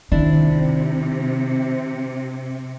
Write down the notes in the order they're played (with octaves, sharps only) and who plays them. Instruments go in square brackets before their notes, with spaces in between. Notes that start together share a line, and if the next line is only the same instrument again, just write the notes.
[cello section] C3 [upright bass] D#3 [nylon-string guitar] D4 E4